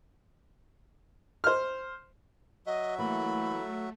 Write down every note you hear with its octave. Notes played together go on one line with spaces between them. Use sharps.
C5 F6
F#3 F#4 D#5 E5
E3 A3 A#3 B5